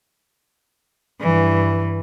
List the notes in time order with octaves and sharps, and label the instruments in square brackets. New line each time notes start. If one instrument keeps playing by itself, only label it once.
[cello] G2 E3